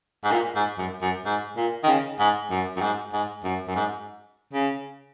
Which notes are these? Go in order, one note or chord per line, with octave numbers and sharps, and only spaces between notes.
G#2
A#2
G#2
F#2
F#2
G#2
A#2
D#3
C#3
G#2
F#2
F#2
G#2
G#2
F#2
F#2
G#2
C#3